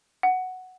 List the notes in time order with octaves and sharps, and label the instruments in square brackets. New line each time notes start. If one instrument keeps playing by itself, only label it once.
[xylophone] F#5